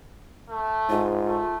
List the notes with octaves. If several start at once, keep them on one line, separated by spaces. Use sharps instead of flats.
A3
G#2 F4
A3